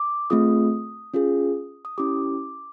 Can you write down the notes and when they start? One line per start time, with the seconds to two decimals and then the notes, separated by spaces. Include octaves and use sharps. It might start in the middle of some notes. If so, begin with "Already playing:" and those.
Already playing: D6
0.30 A3 C4 F4 G#4 D#6
1.14 C#4 F4 G#4
1.85 D#6
1.98 C#4 E4 G4 D6